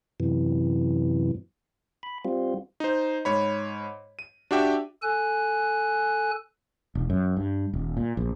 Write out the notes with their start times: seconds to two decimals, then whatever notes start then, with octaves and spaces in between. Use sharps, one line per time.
0.20 F#2 C3 E3
2.03 B5
2.25 G3 C4 F4
2.80 D#4 C5
3.25 G#2 C#5 B5
4.19 D#7
4.51 D4 F#4 G4 E5 G5
5.03 A4 G#5 F#6
6.95 E1
7.10 F#2
7.37 G2
7.73 D#1
7.97 A#2
8.17 A#1